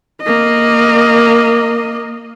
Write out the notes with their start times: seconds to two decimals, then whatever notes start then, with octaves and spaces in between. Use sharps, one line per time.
0.22 A#3 D#5